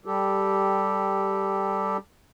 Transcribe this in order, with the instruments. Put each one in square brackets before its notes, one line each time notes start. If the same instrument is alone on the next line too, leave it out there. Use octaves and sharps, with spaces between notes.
[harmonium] G3 G4 A4